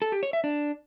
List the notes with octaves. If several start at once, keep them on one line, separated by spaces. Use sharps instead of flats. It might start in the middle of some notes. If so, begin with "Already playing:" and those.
A4
G4
C#5
E5
D4